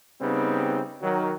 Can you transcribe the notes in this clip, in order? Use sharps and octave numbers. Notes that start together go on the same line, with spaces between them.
C#3 G3 B3 C4 D#4
D#3 F#3